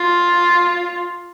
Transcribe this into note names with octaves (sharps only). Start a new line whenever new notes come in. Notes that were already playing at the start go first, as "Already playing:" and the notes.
Already playing: F4